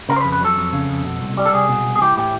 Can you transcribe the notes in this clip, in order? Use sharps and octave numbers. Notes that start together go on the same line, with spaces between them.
C#3 A#4
C5
B4
F2
B4
F#3 A4
F2
C#3
F2
B2
C2
G3
A4
C2 G#4
B2
C2
G#4
E3 G4
A2 G4